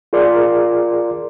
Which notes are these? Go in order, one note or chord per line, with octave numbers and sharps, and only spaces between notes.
F4 G#4 A#4 D5 C6 D6